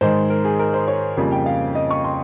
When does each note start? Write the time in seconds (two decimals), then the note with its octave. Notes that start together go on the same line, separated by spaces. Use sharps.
0.01 G#2 D#3 G#3 C5
0.30 A#4
0.45 G#4
0.59 A#4
0.74 C5
0.88 C#5
1.17 F2 C#3 G3 A#3
1.32 G5
1.46 F5
1.75 D#5
1.91 C#6
2.04 C6